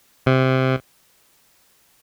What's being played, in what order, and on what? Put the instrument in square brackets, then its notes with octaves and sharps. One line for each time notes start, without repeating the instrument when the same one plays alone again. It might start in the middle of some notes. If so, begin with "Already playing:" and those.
[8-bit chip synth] C3